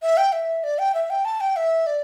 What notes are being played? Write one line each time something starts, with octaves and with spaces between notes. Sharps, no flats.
E5
G5
E5
D5
G5
E5
G5
A5
G5
E5
D5